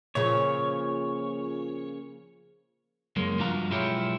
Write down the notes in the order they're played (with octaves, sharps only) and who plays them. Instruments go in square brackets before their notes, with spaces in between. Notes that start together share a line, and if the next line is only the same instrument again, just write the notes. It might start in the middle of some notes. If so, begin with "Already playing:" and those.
[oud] A#2 C#3 F3 [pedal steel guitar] C#5
[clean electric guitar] C#2 F#2 G#3 A#3
G2 F3 D4 F#4 F5 A#5
B1 G#3 E4 F4 G4 C#5